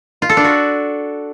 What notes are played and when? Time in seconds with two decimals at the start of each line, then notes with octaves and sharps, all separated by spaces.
0.22 F4
0.29 A4
0.37 D4
0.44 F#4